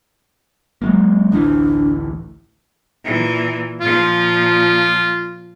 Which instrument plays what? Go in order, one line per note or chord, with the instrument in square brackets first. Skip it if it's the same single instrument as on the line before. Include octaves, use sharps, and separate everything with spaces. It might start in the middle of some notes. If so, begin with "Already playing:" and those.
[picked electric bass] F#3 G#3 A#3
[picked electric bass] A1 D2 E3 [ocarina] D4
[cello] A#2 E3
[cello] A#2 F3 [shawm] F4